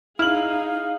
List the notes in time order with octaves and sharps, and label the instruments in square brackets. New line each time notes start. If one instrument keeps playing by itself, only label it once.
[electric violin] D#4 G#4 [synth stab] E4 [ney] F5 [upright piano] F6 F#7